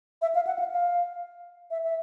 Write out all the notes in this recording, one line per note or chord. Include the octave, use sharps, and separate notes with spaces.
E5
F5
F#5
F5
F5
E5
E5